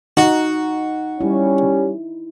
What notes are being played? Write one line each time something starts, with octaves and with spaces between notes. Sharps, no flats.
D#4 F#4
G3 C#4 E4